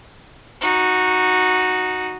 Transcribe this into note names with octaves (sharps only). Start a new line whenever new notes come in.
D#4 F#4